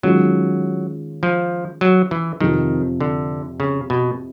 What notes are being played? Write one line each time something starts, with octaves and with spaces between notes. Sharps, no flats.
D#3 F#3 G#3 C#4 F4
F3
F#3
E3
F2 C3 D#3 F3
D3
C#3
B2